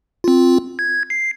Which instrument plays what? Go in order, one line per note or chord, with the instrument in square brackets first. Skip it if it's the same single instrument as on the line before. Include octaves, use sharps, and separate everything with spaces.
[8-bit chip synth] C4 F4
G#6
C7